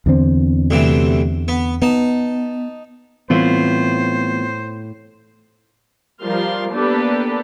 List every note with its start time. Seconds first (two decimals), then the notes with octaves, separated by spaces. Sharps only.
0.06 E2 D3 C4
0.70 D2 C3 E3
1.48 B3
1.82 B3 D#4 A5
3.30 A2 E3 G3 A3 B3 C4 F4 C5
6.22 F3 G3 A#4 F5 C6
6.73 A#3 B3 D4 G4 A4 B4